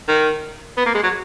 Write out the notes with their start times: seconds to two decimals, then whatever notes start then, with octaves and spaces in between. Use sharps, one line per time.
0.08 D#3
0.77 B3
0.86 A#3
0.94 G#3
1.03 F#3